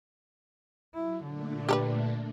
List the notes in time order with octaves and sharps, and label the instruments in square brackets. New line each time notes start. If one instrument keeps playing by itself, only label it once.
[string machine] F#3 [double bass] E4
[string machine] A#2 A3 D4 [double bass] D3
[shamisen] G4 A4 B4